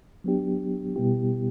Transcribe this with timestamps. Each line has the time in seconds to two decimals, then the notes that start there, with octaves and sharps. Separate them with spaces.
0.24 F#3 B3 D4 G4
0.96 B2 G3 B3 E4 G4